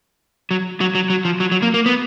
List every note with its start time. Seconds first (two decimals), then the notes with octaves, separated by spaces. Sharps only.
0.51 F#3
0.81 F#3
0.95 F#3
1.10 F#3
1.25 F3
1.40 F#3
1.52 F#3
1.62 A#3
1.74 A#3
1.86 B3